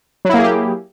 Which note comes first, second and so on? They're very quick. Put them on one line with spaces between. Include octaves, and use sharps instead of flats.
F#3 E4 A#3 G#4 G4